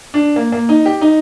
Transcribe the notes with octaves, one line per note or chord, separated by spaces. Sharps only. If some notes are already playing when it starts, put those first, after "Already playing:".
D4
A#3
A#3
D#4
G4
D#4